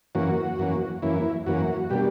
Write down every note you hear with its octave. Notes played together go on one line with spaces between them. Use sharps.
F#2 E3 A#3 C#4 F#4
F#2 E3 A#3 C#4
F#2 E3 A#3 C#4 E4
F#2 E3 A#3 C#4 F#4
B2 G3 A#3 D4 G4